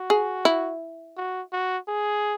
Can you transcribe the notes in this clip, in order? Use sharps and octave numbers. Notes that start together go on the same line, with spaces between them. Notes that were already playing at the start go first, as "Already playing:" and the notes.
Already playing: F#4
G#4
E4
F#4
F#4
G#4